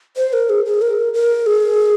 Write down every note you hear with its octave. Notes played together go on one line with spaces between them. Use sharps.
C5
A#4
G#4
G#4
A#4
A#4
G#4